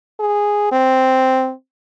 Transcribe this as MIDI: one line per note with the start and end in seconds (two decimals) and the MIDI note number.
0.20 0.72 68
0.72 1.52 60